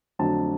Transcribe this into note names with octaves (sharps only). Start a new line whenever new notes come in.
F2 D3 F#3 A3 D4 A5